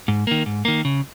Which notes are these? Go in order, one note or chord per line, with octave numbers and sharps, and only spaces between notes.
G#2
D#3 A#3
G#2
D#3 A#3
C#3